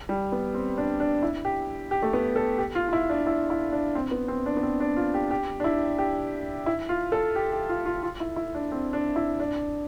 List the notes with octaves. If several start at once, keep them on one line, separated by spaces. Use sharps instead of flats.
G3
B3
C4
D4
D4
E4
G4
G4
A3
B3
A4
G4
F4
F4
E4
D4
E4
E4
D4
C4
B3
C4
D4
B3
C4
D4
F4
G4
G4
D4
E4
G4
E4
F4
A4
G4
G4
F4
F4
F4
E4
E4
D4
C4
D4
E4
D4